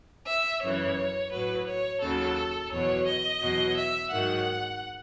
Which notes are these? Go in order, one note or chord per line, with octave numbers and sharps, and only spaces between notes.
E5
F#2 C#3 E3 C#5
A2 F#3 B4
C#5
D#2 C#3 F#3 A4
E2 B2 F#3 C#5
D#5
E2 B2 F#3
E5
G#2 D#3 F#3 F#5